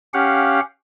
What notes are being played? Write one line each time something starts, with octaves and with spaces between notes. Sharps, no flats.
C#4 G4 F5 F#5